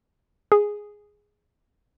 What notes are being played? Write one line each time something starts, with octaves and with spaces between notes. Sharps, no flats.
G#4